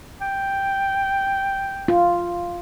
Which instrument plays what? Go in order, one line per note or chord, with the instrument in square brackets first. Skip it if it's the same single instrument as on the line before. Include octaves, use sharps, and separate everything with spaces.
[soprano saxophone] G5
[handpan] F4